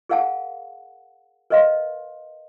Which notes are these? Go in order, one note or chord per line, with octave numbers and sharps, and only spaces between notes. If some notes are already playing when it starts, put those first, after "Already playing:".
G#4 A#4 F5 F#5 A5
A#4 B4 D#5 F5 C6